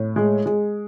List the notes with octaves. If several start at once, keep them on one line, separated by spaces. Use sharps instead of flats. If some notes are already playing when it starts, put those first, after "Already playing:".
Already playing: A2
G#3
G#3